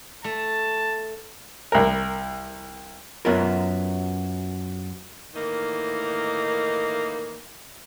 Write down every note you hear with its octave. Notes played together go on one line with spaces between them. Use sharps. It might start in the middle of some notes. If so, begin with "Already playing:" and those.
A3 A5
C2 A#4
F#2 F#3 B3 F4 A#4
A2 D#3 E3 A#3 D#4